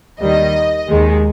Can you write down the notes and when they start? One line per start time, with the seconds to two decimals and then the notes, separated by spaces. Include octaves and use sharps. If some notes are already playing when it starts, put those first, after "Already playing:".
0.20 D#2 D#3 G3 D#5
0.88 D#2 D#3 G#3